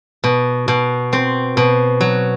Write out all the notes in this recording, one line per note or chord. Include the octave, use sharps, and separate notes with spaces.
B2
B2
C4
B2
F#3